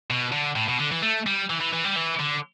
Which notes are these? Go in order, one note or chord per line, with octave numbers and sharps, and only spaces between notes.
B2
D3
A2
B2
D3
E3
A3
G3
E3
E3
E3
G3
E3
D3